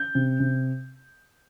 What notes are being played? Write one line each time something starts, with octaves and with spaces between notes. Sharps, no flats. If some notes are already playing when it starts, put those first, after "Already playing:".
Already playing: G6
C3
C3